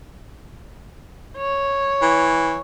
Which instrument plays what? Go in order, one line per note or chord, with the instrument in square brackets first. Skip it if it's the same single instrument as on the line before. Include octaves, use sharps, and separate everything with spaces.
[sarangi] C#5
[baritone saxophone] E3